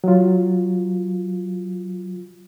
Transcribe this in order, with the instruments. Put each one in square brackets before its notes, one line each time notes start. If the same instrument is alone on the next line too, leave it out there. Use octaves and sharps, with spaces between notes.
[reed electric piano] F#3 F4